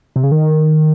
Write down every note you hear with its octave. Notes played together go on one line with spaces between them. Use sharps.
C3
C#3
D#3